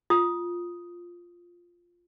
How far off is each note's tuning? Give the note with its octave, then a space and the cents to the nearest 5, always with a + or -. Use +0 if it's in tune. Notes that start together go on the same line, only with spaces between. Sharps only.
F4 +0 D#6 +0